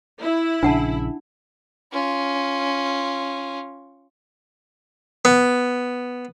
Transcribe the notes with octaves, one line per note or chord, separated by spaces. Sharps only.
E4
A#1 C#3 D4 F#5 A5
C#4 F4
B3